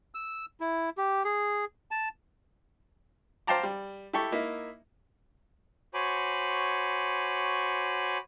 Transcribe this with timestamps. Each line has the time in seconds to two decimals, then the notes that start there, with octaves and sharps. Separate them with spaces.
0.15 E6
0.60 E4
0.97 G4
1.25 G#4
1.91 A5
3.47 C5 F5 G5 A5 A#5 D6
3.63 G3
4.13 E4 G4 A4 C#6
4.32 A#3 D#4 E4 E5
5.94 F#4 C5 C#5 G#5 B5 D6